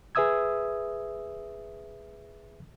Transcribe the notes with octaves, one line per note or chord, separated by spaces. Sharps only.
G#4 B4 E5 D#6 E6 G#6